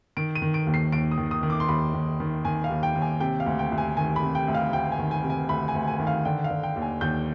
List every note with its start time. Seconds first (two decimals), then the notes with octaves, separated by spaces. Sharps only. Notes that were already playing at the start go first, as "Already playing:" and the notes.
0.17 D#3 D7
0.35 D#7
0.42 D#3
0.54 D7
0.67 D#2
0.74 C7
0.92 D#2 D7
1.11 D#6
1.18 D#3
1.31 D#6
1.43 D#3
1.50 D6
1.60 C6
1.68 D#2 B5
1.94 D#2
2.20 D#3
2.45 D#3 G#5
2.64 F5
2.70 D#2
2.83 G5
2.95 D#2
3.02 G#5
3.20 C3 G5
3.40 F5
3.46 D2
3.59 G5
3.72 D2
3.78 G#5
3.97 D#3 G#5
4.16 B5
4.22 C3
4.35 G5
4.48 D2
4.54 F5
4.73 D2 G5
4.92 G#5
4.99 D#3
5.11 G#5
5.24 C3
5.30 G#5
5.49 D2 B5
5.68 G#5
5.75 D2
5.87 G#5
5.99 D#3
6.07 F5
6.25 D3 G5
6.44 F5
6.51 D3
6.63 G5
6.76 D#2
6.82 G#5
7.01 D#2 G6